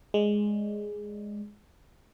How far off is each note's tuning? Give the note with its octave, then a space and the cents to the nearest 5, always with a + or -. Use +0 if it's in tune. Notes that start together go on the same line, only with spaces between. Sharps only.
G#3 +0 D5 +0